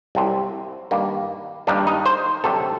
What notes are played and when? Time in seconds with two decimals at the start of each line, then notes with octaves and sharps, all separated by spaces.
0.15 C2 C3 F#3 C4
0.91 G2 D#3 G3 A#3
1.67 G2 D#3 G3 A#3 D4
1.87 D#4
2.06 C5
2.44 D2 C3 F#3 C4 A4